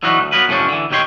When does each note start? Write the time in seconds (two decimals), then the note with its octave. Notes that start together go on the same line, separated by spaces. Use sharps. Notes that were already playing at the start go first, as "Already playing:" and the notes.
0.03 D3 E3 F#3 D#4 F#4 B4
0.20 D2
0.32 F#3 A#3 B3 A#4 B4
0.48 F#2 A2 C#3 F3 C#4 D4
0.68 D3 E3
0.90 D#2 A#2 D#3 G4 C#5 C6